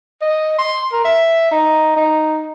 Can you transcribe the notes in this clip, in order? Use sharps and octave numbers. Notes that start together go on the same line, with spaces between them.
D#5
C6
A#4
E5
D#4
D#4